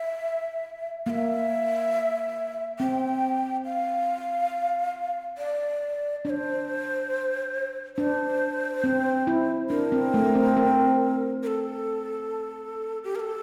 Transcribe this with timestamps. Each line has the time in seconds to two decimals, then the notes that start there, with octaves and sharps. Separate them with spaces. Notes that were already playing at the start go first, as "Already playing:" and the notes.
Already playing: E5
1.06 A#3 E5 F5
2.79 C4 G5
3.65 F5
5.38 D5
6.25 D4 D5
6.30 C5
7.97 D4 C5
8.84 C4
9.27 E4
9.70 D4 A#4
9.92 C4
10.14 A3
10.35 C4
10.57 C4
11.43 A#4
11.47 A4
13.04 G4
13.15 A#4
13.20 A4